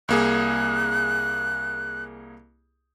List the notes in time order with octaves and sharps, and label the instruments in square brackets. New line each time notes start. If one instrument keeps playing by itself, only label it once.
[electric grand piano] C2 A#3 G#4 [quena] F#6